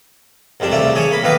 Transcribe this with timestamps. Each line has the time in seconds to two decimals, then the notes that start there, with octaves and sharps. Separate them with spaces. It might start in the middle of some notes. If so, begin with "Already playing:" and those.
0.60 C2 F2 G3 D4
0.72 C2 C#3 A3 D5
0.95 G#4 A4 C#5 D6
1.11 A#3 B5
1.23 B1 A2 D#4 B4 F5 D6